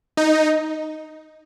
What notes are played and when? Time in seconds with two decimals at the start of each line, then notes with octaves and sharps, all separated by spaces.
0.17 D#4